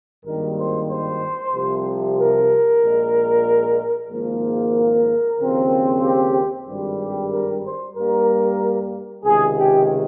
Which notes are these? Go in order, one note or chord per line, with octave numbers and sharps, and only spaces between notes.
G#1 G2 D#3 G3 A#3 A#4
C5
C5
C2 C3 F3
A#4
A#1 A#2 G#3
G#1 G#2 F3 A#3
A#4
D#2 C#3 F3 C4
G4
G#1 G2 G3
G4
A#4
C5
G2 G3 A#3 A#4
C#2 C3 D#3 G#4
G4